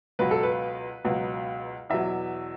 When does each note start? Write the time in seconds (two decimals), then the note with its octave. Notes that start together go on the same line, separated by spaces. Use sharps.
0.19 C#2 B2 F#3 B4
0.31 A4
0.43 B4
1.04 C#2 B2 F#3
1.90 E2 B2 F#3 E5